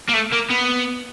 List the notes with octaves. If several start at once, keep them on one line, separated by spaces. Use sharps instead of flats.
A#3
A3
A#3
B3